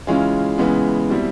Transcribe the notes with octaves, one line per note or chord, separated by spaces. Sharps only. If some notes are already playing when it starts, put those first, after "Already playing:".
C#3 E3 G#3 C#4 F4
C#3 E3 G#3 B3
B2 G3 C4 E4